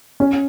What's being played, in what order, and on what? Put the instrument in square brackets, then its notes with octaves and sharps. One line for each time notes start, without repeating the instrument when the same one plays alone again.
[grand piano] C#4